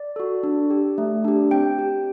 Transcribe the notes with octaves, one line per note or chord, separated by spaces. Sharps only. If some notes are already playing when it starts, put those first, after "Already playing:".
Already playing: D5
F#4 A4
D4
G4
A3
D4 G4
C4 G5
G4